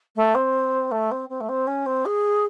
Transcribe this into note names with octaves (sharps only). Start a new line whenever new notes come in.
A3
C4
A3
C4
C4
A3
C4
C#4
C4
G#4